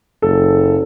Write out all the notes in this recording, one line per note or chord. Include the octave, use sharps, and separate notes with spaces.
F#1 A4